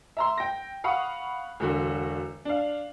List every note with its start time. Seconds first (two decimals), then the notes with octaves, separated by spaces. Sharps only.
0.17 E5 A#5 C6
0.38 G5 A#6
0.84 F5 F#5 B5 C#6 D#6
1.60 E1 D3 F#4
2.45 D4 F5